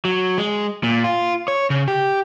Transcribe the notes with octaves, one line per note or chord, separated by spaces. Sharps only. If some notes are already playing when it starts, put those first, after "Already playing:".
F#3
G#3
A#2
F4
C#5
C#3
G4